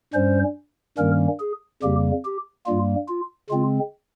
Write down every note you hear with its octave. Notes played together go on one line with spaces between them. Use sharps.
G2 G3 C#4 C5
G2 D#3 G3 A#3 C#4 A#4
G#4
F2 C#3 G3 A#3 G4
G4
G2 G3 A#3 F4
F4
C#3 G#3 C4 F4